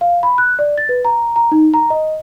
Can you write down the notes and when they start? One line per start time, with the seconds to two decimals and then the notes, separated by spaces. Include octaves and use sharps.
0.01 F5
0.23 B5
0.38 F#6
0.59 D5
0.78 A6
0.89 B4
1.05 A#5
1.36 A#5
1.52 D#4
1.74 A#5
1.90 D#5